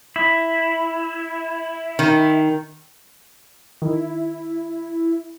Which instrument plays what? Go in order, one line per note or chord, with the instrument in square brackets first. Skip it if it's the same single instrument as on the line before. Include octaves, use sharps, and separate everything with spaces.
[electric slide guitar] E4
[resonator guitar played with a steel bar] D#3
[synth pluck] D#3 [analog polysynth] E4